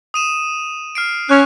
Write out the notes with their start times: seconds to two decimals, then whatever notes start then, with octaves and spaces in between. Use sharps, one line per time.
0.14 D#6 D#7 E7
0.95 F6 C7 D7
1.29 C#4 C#6 F#6